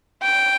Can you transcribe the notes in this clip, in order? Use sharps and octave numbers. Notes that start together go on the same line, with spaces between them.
G5